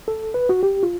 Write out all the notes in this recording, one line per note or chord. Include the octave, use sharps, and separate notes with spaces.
A4
B4
F#4
G4
F4